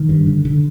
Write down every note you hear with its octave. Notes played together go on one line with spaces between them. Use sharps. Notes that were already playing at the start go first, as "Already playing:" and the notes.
Already playing: D#3
G2
D3
D3